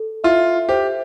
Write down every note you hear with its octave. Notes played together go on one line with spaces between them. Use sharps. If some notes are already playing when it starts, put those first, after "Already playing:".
Already playing: A4
F4 E5
G4 C5